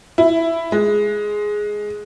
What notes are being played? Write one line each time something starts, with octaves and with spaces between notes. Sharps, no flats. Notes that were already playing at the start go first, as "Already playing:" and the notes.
E4
G#3